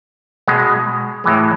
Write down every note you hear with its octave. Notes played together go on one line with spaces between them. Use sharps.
B2 G#3
A2 E3 G#3